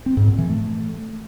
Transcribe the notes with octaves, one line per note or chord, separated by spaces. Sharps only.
C4
G#2
A#2
E3
A3